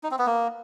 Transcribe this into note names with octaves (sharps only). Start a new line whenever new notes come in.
D#4
C4
B3
A#3